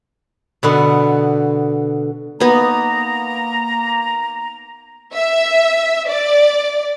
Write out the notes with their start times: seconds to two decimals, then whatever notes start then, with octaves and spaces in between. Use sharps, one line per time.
0.63 B2 D3 B3
2.40 A#3 B3 D#4 A#5
5.13 E5
6.09 D5